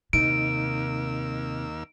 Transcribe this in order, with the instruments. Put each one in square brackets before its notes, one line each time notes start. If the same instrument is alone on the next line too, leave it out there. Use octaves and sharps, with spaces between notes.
[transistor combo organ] D#2 A#3 E6 [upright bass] C3 [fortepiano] D#4 [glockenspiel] D7